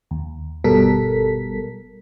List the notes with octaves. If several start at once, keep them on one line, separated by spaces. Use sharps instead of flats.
D#2
G1 B2 G3 A4 A#4 B6